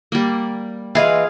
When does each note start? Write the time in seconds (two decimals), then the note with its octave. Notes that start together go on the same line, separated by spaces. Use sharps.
0.12 G3 A#3
0.95 E3 G#3 F4 G#4 F5